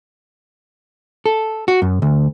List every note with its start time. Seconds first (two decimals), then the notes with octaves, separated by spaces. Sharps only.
1.26 A4
1.68 F#4
1.82 F#2
2.02 D2